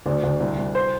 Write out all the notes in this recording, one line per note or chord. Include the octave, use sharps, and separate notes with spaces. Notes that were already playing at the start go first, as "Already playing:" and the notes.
D2 D4
D2 D4
C2
C2
C5